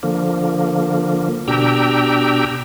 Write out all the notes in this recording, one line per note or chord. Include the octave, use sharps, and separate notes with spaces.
D3 F3 A#3
B2 D4 G4 G5 A#5 E6